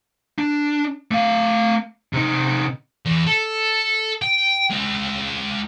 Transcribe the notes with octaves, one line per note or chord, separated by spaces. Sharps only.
D4
A3 F5
C3 D#4
E2
A4
G5
G#3 F4